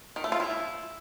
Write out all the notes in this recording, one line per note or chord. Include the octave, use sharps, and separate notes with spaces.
D#3
A3
F4
E4